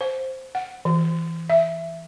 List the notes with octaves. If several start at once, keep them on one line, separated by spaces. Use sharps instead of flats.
C5
F#5
E3
E5